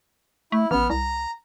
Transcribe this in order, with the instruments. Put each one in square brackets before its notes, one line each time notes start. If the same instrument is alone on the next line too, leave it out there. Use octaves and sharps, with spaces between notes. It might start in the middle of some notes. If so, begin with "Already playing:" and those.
[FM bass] A3 [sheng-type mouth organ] E4
[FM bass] A1 [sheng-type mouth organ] B3 F6
[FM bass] C2 [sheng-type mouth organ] A#5